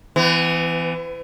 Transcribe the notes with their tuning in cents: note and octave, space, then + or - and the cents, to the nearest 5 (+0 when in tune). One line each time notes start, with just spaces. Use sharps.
E3 +15 B3 +45